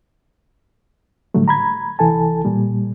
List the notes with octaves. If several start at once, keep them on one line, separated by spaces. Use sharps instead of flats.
A2 D3 F#3 G3 A3
A#5 B5 G#6
C2 E3 A4 G#5 A5
A#2 G3